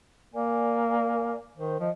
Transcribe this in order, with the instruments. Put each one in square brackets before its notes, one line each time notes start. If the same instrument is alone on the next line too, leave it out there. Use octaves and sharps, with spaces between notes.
[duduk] A#3 [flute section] A#4 D5 G#5
[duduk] D#3 [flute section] C5
[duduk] F3 [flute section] D#5